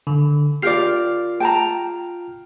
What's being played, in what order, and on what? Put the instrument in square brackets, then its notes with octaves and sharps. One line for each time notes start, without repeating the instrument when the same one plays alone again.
[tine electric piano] D3
[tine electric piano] F4 F6 C7 [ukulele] G4 A#4 D5
[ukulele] G5 A5 A#5